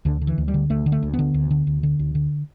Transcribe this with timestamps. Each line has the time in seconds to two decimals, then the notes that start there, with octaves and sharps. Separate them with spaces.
0.05 D2 D3
0.21 D3
0.27 E3
0.38 D2
0.48 G3
0.54 D3
0.70 D2 A3
0.86 D3
0.92 A3
1.03 D2
1.13 B3
1.19 D3
1.34 D2
1.51 D3
1.67 D2
1.83 D3
1.99 D2
2.15 D3